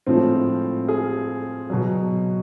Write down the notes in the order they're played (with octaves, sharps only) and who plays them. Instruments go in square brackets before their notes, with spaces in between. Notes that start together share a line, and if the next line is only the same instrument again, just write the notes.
[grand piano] A2 F3 G#3 C4
G#4
B2 F#3